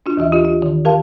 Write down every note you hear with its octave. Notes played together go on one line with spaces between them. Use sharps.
D4 F4 F#4
D#2 E3 F#4 E5
F4 G4 D#5
F4
D#3
G4 A#4 F5 A5